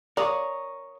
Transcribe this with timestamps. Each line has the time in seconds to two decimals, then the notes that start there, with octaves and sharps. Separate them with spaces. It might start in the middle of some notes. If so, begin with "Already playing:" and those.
0.17 A#4 C#5 D5 F5 A#5 C#6 D#6